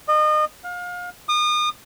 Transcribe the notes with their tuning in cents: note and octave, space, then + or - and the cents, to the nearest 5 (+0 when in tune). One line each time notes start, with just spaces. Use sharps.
D#5 -30
F5 +35
D#6 -35